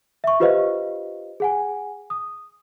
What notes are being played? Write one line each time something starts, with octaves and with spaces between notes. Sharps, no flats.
E5 C#6
F4 G4 B4 C5 D#5 F5
G#4 F#5 G#5
D#6